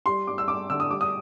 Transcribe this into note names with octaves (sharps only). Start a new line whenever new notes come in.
G3 C6
G2 D6
E6
G2 D6
D3 E6
D#6
G3 D6
D#6